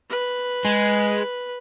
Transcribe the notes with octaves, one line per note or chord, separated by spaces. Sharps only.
B4
G#3